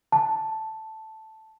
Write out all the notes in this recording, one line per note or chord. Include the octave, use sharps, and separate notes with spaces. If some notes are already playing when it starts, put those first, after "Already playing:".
A5